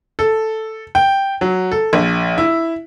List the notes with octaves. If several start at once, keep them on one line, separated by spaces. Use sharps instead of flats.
A4
G5
F#3
A4
A#1
E4